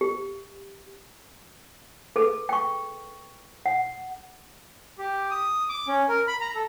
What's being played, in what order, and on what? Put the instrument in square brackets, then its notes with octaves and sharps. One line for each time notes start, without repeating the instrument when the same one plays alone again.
[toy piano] G4
G#4 A4 B4
G5 C#6
F#5
[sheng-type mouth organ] G4
D#6
D6
C#4
A#4
B5
A#5
A4